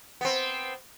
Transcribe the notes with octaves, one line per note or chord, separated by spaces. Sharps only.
B3 C4